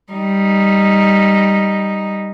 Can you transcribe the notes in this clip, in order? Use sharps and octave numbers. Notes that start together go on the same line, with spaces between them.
G3 D#4